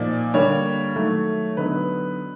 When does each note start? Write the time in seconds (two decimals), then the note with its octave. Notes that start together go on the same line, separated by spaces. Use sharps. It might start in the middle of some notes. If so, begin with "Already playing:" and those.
Already playing: A#2 F3 A#3 D#4 D5
0.34 D3 G3 A#3 C#5
0.96 D#3 F#3 A3
1.57 D3 F#3 B3 D#4 B4